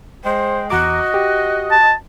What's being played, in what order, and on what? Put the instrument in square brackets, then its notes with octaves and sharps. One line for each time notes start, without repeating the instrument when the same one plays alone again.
[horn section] G#3 G5 [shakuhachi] C5
[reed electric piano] E2 A#5 D6 [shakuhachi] F#4 [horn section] D#5
[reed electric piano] G4
[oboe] A5